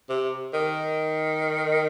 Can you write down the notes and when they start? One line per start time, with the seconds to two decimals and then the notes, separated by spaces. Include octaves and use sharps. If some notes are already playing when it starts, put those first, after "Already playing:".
0.09 C3
0.53 D#3